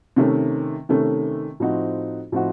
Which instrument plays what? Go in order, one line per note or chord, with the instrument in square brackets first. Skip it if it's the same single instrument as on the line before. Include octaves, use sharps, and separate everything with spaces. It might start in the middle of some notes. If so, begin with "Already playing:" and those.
[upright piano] C3 D#3 A3 C#4
C3 D#3 A3 C#4
A2 F3 C4 D#4 F#4
A2 F3 C4 D#4 F#4